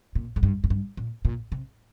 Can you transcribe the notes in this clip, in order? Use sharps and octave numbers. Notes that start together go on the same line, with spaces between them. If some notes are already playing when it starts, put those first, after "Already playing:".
A#2
G#2
G2
G#2
G2
A#2
A#2
C3